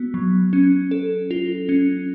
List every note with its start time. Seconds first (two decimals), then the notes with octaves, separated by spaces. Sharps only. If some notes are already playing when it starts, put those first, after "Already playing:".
Already playing: B3 F#4
0.14 F#3
0.53 C#4
0.91 A4
1.31 F4
1.69 C#4